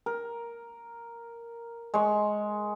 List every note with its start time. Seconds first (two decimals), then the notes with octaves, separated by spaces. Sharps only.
0.06 A#4
1.94 G#3 C#6